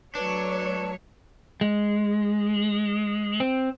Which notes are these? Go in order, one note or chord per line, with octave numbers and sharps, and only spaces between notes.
F#3 A3 D4 B4 C#5
G#3
C4